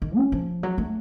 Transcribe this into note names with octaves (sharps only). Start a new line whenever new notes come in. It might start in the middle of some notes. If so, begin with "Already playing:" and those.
D#3
C#4
F3
F#3
A3